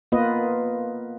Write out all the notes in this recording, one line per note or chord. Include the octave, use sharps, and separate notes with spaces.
A#3 B3 F4 B4 D#5